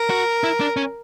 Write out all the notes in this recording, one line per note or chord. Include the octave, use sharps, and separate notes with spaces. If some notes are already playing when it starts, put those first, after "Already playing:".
Already playing: A#4
F#4
E4
D4
C#4